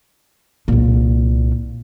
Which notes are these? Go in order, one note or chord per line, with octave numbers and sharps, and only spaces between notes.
C2 A#2